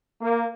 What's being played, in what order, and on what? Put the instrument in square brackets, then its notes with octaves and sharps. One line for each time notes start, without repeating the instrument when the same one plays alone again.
[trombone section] A#3